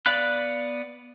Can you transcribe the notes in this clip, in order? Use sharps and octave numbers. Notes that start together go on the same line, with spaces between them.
B3 D5 F5 B5 F#6